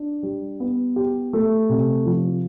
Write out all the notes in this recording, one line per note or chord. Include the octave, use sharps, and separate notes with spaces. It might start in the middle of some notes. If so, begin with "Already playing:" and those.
Already playing: D4
G3
B3
G4
A3
C3
F3